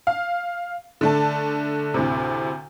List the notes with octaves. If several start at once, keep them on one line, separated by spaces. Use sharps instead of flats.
F5
D3 A3 A5
D2 A2 C3